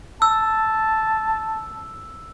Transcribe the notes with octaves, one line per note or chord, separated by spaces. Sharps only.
A5 E6